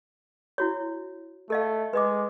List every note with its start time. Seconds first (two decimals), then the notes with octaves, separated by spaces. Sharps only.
0.58 E4 F#4 C#5
1.50 A3 A4 D#5 F5
1.93 G#3 B4 D#5 D6